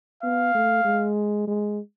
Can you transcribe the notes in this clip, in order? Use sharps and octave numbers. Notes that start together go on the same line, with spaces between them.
B3 F5
A3
G#3
G#3